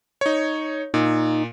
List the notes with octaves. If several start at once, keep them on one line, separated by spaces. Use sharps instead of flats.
D#4 C#5
A#2 D#4